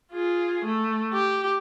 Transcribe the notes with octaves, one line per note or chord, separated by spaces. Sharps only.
F4 G#4
A3
G4